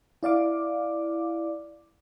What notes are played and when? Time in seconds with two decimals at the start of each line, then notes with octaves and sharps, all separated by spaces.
0.23 E4 D5 F5 D6